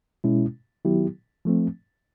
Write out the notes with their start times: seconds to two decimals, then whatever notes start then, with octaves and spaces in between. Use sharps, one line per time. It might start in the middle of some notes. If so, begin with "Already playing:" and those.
0.24 B2 G#3 C#4 E4
0.85 D#3 F#3 B3 E4 G4
1.45 F3 A3 C4